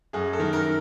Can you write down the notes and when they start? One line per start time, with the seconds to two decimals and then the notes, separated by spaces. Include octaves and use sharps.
0.13 F#2 G#4
0.33 A4
0.40 D#3
0.53 A#4